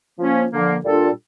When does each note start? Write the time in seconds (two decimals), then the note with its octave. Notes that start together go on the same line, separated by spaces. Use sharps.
0.18 F3 A#3 C#4
0.50 D3 F3 A#3
0.82 A#2 G3 D4 F4 A4